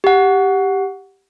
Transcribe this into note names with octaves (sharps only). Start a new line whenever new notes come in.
G4 F#5